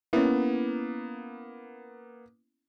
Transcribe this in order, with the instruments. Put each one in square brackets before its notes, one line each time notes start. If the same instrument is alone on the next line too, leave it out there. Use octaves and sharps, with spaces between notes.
[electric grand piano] A#3 B3 [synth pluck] C#4 E4